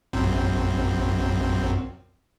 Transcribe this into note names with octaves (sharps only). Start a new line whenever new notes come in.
A#1 F#2 C4